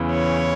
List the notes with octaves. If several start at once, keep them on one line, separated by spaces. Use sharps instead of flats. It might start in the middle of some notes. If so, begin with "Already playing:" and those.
Already playing: E2 C#3 E3
C#5